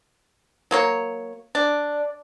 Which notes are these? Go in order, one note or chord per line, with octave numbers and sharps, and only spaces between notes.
F#3 A#3 C#5
D4 D5